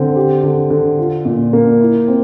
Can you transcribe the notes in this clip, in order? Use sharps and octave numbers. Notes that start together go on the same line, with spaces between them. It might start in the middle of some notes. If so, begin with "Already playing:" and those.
Already playing: D3 C4
G4
D3
D3
F4
A#2
A#3
E4
C4